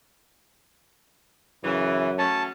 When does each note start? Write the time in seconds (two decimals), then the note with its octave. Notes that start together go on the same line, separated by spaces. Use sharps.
1.64 F#2 C#3 E3
2.19 F#3 A3 C#4 A5